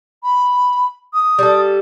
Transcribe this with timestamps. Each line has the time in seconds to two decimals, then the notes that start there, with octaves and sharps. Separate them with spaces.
0.24 B5
1.14 D#6
1.39 G3 A4